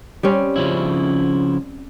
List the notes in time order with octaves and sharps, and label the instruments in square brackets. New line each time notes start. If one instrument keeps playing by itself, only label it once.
[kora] G3 C4 C#4
[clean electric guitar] C#3 F3 E4